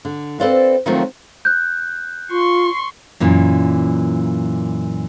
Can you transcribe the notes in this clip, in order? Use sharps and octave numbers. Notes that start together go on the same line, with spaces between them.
D3
C4 A4 B4 C5 D5 F5
D#3 F3 F#3 A3 C4 F4
F#6 G6
F4 C6 C#6
F#2 A#2 E3